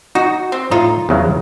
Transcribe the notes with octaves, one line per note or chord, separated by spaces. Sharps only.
D#4 F#4
C4
A2 D#4 F4
E2 C#3 F#3